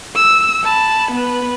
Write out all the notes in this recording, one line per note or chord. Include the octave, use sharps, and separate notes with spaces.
E6
A5 B5
B3 B4